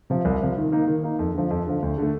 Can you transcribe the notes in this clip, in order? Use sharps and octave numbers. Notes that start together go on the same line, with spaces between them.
C3 F3
C2
C3 F3
D#3
A#3 D#4
D#3
A#3 D#4
F2
D3 F3
F2
D3 F3
D2
D3 A3